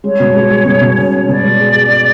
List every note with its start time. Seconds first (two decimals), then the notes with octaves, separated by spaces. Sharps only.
0.04 G#3 C#5
0.20 B2
0.35 G#3
0.51 G#4
0.65 B2
0.81 B2
0.97 C#4
1.13 C#4
1.28 B2 D5
1.43 G#3
1.60 G#4
1.75 G#4
1.90 G#4